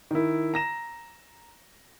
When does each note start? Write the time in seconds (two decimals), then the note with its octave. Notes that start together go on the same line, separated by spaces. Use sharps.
0.11 D#3 E4
0.54 A#5 A#6 E7